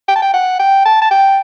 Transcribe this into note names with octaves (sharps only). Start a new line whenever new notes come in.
G5
A5
G5
F#5
G5
A5
A5
G5